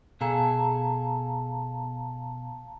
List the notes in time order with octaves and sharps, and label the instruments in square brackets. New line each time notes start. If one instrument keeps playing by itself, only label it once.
[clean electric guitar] B2 G#4 A4 [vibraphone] F5 A5 A#5